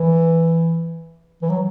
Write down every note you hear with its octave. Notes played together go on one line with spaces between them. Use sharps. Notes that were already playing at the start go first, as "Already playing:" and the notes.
Already playing: E3
E3
F#3